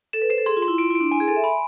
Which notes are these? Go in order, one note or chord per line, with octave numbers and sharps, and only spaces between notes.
A4 E7
B4
C5 E7
A4
G#4 C6
F4
C6
E4
F4 D7
E4
D7
D4
E4 G#5
G#4
A4 G#5
E5
B5